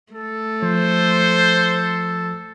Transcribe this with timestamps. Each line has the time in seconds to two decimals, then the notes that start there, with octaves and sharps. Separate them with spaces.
0.13 A3 A4
0.62 F3 C5